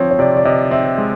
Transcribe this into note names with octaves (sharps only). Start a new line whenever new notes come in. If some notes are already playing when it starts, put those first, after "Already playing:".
Already playing: F3 C4 C#5
C#5
C3 D5
D5
C3 D#5
C4 E5
G#3